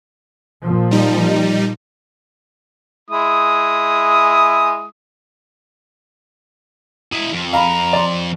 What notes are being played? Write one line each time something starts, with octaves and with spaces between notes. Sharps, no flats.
A#2 F3
G3 D#4
G#3 E4 D#6
E4 D#5
F2
F5 A#5 B5
D5 C6